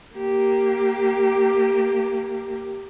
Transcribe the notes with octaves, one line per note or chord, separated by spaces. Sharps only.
A#3 G4